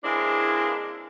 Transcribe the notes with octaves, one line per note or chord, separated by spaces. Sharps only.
E3 G#3 A#3 C4 D4 E4